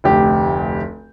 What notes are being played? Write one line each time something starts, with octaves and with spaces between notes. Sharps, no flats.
F1 D2 G4